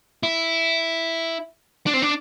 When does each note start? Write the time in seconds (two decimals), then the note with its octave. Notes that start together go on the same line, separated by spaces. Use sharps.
0.23 E4
1.87 D4
1.94 C4
2.02 D4